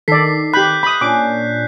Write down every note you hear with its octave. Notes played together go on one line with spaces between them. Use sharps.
D#3 A4 D5 B6 C7
G4 B5 F#6 G6
B5 D#6
A#2 C#4 D4 C#5 D6